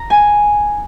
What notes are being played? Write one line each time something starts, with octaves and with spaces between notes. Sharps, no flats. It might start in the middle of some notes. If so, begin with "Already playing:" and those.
Already playing: A#5
G#5